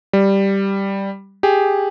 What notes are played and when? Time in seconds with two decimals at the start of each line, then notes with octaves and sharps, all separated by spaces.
0.13 G3
1.43 G4 G#4